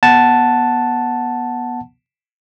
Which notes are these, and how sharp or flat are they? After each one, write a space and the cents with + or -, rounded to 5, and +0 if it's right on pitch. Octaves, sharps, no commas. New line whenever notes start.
B3 -25 F#5 +0 A5 +0